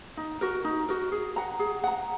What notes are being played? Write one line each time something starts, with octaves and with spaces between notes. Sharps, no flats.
D#4
F#4 A#4
D#4
F#4 A#4
G#4
F#5 A#5
G#4
F#5 A#5